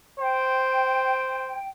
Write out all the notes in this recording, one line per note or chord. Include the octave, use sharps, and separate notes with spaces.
C5 G5